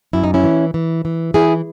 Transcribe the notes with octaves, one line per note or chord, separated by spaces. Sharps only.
F#2 E4
D#4
C#4 E4
E3
E3
E3
E3 E4 G#4